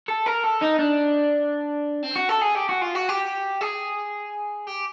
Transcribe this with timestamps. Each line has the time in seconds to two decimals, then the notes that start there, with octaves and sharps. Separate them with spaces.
0.08 A4
0.26 A#4
0.43 A4
0.61 D#4
0.79 D4
2.03 C4
2.16 F#4
2.29 A4
2.42 G#4
2.56 G4
2.69 F#4
2.82 F4
2.95 F#4
3.09 G4
3.61 G#4
4.67 G4